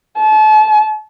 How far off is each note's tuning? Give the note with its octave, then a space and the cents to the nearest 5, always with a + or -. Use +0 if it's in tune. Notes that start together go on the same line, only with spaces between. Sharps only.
A5 -35